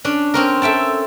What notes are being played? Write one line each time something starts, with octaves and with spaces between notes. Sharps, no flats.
C#4 D4
C4 C#4 A#4
A4 E5 G5 A5